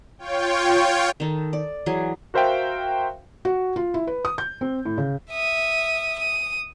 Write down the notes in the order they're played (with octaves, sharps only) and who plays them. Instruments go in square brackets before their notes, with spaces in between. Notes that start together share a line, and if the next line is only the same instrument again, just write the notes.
[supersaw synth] F4 C#5 G5
[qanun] D#3 D#4 A4
D5
E3 F#3 G#4
[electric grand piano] F#4 A#4 C5 E5 F5 G5
[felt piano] F#4
F4
E4
B4
D#6
G6
C4
A2
C#3
[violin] E5 D#6
D#6